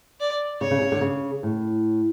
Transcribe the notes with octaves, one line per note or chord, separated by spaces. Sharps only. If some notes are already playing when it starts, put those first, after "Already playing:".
D5
C#3 C#5
C#3
C#3
D3
C#3
A2